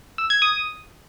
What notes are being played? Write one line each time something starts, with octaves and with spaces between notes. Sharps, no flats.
E6
G#6
D#6